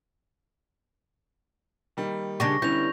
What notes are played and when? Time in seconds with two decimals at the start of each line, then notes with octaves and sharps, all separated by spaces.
1.97 D#3 G3 A#3
2.40 C#3 D4 G4 C#6 A#6
2.62 D3 G3 B3 C#4 E4 B4 G6 F7